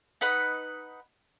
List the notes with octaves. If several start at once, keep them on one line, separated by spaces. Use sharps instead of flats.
D#4 B4 F#5 B5